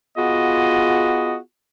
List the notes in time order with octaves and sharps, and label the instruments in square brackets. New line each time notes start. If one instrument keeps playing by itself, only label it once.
[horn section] B3 F4 F#4 G#4 D#5